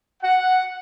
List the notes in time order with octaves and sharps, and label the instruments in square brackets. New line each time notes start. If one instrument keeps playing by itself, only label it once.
[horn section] F#5